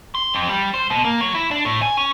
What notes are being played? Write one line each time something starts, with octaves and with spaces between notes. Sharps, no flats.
C6
F2
G3
C5
B2
A#3
F#3
E4
D4
A2
G#5
C#4